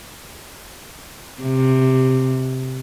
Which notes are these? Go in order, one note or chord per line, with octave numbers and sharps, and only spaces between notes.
C3